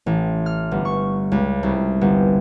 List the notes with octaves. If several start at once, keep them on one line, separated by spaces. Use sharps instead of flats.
A1
F6
G1
C#6
C#2
C2
G1